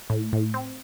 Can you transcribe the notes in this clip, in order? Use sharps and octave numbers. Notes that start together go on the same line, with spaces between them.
A2
A2
C4